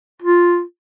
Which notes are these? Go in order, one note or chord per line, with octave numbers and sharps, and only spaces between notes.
F4